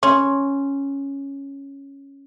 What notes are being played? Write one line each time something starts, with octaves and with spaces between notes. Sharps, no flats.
C#4 C6